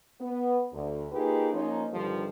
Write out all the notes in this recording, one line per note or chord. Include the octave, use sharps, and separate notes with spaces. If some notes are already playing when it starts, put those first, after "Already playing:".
B3
D2
A#3 D#4 F4 G4 G#4 B4
F3 A#3 C#4 D#4
G2 D3 D#3 F3 G3